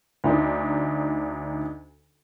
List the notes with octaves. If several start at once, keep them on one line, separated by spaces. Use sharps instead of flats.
D2 D4 D#4